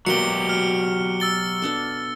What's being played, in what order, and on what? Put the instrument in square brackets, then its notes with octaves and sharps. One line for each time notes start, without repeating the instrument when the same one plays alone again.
[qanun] B2 A#3 D5 [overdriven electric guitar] F#3 G4 [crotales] C#7 G7
[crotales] F6
E6 A6 G7
[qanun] B3 D4 A4